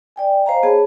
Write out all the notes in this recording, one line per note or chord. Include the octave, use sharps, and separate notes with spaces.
D5 G5 G#5
C5 D#5 F5 G#5 A#5
B3 G#4 C#5 A5